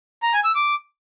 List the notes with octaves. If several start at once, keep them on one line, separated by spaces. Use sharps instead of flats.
A#5
G#5
E6
D6